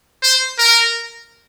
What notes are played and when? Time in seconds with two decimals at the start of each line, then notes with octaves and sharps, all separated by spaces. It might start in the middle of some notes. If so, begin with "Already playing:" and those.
0.23 C5
0.59 A#4